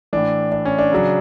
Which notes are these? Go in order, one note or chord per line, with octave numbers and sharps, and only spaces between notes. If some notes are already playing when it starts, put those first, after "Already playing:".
A2 E3 D4
D4
C#4
D4
C#3 F#3